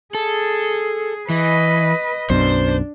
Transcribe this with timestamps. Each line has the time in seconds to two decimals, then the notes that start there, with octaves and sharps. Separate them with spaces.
0.15 G#4 A4
1.30 E3 B4 D#5
2.30 B1 F#2 B2 D4 C5